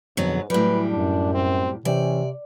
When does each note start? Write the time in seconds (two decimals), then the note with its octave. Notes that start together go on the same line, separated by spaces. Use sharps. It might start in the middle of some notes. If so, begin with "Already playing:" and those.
0.17 F2 G#2 B2 D3 F#3 B3
0.50 A2 E3 F#3 G3 B4
0.90 F#2 D4
1.34 C4
1.85 C3 E3 C#4 C5 D5 G5